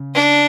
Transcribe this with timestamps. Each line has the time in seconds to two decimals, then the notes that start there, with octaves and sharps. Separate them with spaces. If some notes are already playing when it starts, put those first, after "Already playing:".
Already playing: C#3
0.14 D4